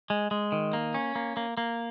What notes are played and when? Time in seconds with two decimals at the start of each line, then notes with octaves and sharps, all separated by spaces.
0.10 G#3
0.31 G#3
0.52 D#3
0.73 A#3
0.94 C#4
1.16 A#3
1.37 A#3
1.57 A#3